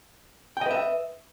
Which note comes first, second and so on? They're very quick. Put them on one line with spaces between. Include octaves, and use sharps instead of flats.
G5 D#5 B4 E5